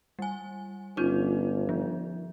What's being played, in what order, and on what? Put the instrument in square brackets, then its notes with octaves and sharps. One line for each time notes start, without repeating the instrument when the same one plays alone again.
[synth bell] G3 G#5
[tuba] G1 [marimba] C#4 F4 G6 [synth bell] D#4
[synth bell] F3